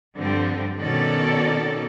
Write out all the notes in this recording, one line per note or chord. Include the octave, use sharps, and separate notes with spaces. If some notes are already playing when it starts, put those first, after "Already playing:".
G2 D3 F3 G3 C4
B2 D#3 C#4 A4 D5